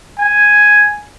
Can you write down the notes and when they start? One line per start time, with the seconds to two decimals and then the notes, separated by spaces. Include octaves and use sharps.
0.20 G#5